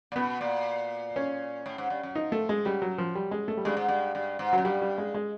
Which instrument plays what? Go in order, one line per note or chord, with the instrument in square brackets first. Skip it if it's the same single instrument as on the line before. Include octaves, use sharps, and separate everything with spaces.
[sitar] A#2
[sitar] B2 [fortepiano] B3
[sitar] A#2
[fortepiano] C#4
[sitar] A2
G#2
G2
F#2
[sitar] F3 [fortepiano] D#4
[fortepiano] A3
G#3
[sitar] F#2 [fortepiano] G3
[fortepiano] F#3
F3
G3
G#3
A3
G3
[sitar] G2 [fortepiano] G#3
[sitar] G#2
G2
G2
G#2
[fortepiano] F#3
[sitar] F#2
[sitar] G2 [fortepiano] G3
[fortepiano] G3
G#3
G#3